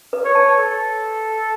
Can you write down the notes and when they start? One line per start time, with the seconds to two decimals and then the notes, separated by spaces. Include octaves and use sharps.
0.13 B4
0.25 C#5
0.35 A5
0.57 A4